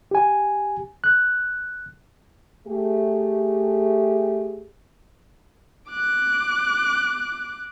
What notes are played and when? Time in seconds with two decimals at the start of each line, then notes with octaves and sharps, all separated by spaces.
0.11 G4 G#5
1.04 F#6
2.68 A3 G4 G#4
5.89 D6 F#6